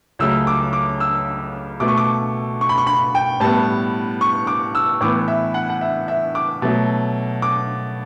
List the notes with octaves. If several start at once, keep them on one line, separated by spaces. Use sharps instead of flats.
C#2 C#3 F#3 A3 E6
D6
D6
E6
B2 A3 D6
C#6
D6
C#6
B5
C#6
B5
G5
A2 G3 B3 A5
C#6
D6
E6
A2 E3 B3 D6
E5
F#5
F#5
E5
E5
D6
B2 F#3 A3
D6